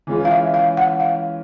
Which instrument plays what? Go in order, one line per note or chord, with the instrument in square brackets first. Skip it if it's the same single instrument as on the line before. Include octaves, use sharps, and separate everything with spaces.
[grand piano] E3 G#3 C#4 F4
[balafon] F5
E5
F5
F#5
F5